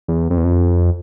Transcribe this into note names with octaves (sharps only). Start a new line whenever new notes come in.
E2
F2
E2
F2